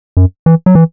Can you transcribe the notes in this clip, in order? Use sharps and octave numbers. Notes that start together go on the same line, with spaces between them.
F#2
E3
F#3
E3